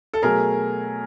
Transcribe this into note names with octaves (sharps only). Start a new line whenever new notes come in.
A4
B2 F#3 A3 G#4 A#4